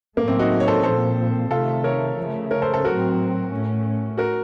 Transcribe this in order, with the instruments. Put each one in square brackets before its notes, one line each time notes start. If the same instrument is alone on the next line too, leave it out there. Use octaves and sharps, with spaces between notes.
[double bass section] A2 F#3 A3 [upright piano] A#3
[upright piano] C4
D#4 F#4
C#5
A4 C5
[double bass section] A#2 F3 C4 [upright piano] A4 C5
[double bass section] C3 D#3 A3 [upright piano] F4 A4
[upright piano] A#4 C#5
[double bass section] C#3 F3 A3
[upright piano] A#4 C#5
A4 C5
A4 C5
[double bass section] A2 F#3 C4 [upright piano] F#4 A#4
[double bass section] A2 A3 C#4
[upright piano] F#4 A#4